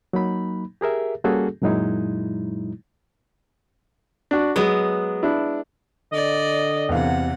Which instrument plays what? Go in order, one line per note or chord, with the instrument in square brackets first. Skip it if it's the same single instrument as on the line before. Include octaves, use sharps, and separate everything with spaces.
[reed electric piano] F#3 A#3 D#4 B5
G4 G#4 A#4 E5
G3 A#3 C#4 F#4 G#4 A4
F#2 A#2 F#3 G#3 D#4 E4
[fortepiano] D4 F#4
[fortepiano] F#3 [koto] G#3 B3
[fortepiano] D4 E4
[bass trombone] D3 [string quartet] D5 [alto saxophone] D#5
[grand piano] E2 E3 F5 [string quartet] C3 F#5